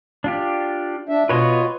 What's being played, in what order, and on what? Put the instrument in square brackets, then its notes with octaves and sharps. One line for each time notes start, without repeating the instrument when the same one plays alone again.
[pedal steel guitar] D4 F4 G4
[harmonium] D4 E5
[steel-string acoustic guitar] B2 B3 [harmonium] F4 [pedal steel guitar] B4 C#5 D#5